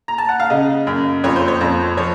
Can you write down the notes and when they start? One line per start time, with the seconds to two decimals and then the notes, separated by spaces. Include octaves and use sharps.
0.08 A#5
0.18 A5
0.29 F#5
0.40 F5
0.50 C#3 D#5
0.87 F#2
1.24 F2 C#5
1.36 C5
1.48 C#5
1.61 F2
1.97 F3 C#5